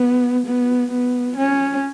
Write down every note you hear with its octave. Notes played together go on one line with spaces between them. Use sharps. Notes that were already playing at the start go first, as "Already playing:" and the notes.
Already playing: B3
B3
B3
C#4